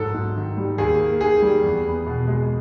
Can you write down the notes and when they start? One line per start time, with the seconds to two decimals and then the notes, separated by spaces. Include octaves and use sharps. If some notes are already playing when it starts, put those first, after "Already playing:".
Already playing: G#2 F#3 A4
0.14 G#2
0.36 D#3
0.57 G3
0.78 D#2 G#4
1.00 A#3
1.21 D#3 G#4
1.42 G3
1.64 E2
1.85 B3
2.06 B2
2.28 G#3